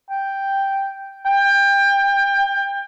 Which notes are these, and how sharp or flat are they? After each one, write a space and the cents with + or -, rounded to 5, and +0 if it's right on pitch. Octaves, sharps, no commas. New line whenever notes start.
G5 +0
G5 +25